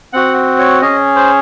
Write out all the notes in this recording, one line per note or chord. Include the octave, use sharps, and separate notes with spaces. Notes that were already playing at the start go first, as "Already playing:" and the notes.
C4 F#4 F#5
C#5
C#4 G#4 D#5
C5